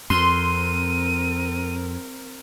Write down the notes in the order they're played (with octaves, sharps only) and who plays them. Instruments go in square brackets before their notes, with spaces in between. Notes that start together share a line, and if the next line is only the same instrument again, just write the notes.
[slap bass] F2 [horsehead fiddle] C4 A#4 [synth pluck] C6 [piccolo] D#7